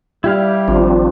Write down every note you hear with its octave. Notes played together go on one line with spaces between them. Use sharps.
G3 E4 G4 F5
G#1 F3 C4 D4